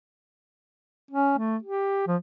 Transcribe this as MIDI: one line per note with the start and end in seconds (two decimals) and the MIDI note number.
1.11 1.35 61
1.38 1.57 57
1.63 2.06 67
2.08 2.16 53